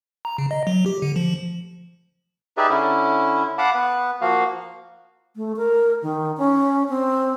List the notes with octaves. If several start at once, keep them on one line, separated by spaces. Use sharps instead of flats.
A#5
C#3
D#5
F#3
G4
D3
F3
D#4 G4 G#4 B4 D5 E5
D3 C#4 E4
F5 F#5 A5 B5 D6
B3 B4
F3 A#3 F#4 F5
A3
A#4
D#3
C#4
C4